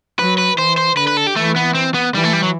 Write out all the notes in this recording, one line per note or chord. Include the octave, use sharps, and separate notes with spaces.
F#3 B4
B4
E3 C5
C5
D3 B4
B4
A4
G4
E3 A3
B3
C4
B3
E3 G3
A3
G3
F#3